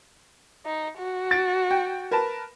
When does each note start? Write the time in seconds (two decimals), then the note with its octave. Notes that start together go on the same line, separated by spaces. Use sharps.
0.66 D#4
0.99 F#4
1.31 A6 D7
1.71 G5
2.11 A#4 B4 A5